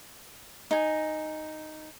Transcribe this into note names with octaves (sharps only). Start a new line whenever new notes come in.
D#4 G#5